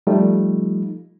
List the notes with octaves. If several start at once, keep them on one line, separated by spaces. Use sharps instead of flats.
F3 G3 A3 D#4 F4